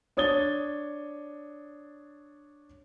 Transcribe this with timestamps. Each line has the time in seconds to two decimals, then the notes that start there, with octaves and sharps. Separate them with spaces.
0.17 D4 C#5 D#6 A6 G7